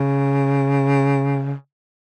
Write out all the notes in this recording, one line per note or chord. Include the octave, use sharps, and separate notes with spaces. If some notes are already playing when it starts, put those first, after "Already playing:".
Already playing: C#3